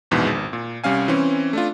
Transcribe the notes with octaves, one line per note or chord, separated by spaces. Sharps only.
A#1 E2 G#2 B2 E3
G#1
A#2
C2 G3 C#4 F5 G#5
E3 C4 C#4
A3 D4 F4